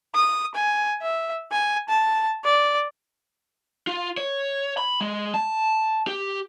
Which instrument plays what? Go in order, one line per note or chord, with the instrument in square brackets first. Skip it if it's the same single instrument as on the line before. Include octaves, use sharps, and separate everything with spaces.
[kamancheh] D#6
G#5
E5
G#5
A5
D5
[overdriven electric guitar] F4
C#5
B5
G#3
A5
G4